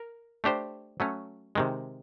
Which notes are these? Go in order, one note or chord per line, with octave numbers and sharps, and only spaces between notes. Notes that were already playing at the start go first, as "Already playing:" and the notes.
Already playing: A#4
A3 D4 G4 C5
F#3 A3 C#4
C3 D#3 G#3